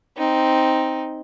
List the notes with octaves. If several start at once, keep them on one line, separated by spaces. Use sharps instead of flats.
C4 D#4